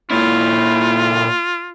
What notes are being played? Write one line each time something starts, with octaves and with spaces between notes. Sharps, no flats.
A#2 E4 F4